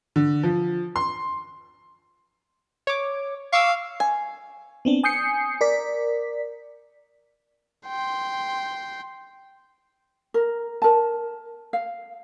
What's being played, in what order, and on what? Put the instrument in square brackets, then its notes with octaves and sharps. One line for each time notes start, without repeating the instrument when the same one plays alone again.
[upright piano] D3
F3
C6
[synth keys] C#5 D6
[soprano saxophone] F5 [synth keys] C#6 D6 E6
[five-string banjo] G#5
[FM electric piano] B3 C4 D4
G#5 D#6 G6 C7 C#7
A#4 D5 B6
[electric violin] G5 C6
[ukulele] A#4
A#4 A5
F5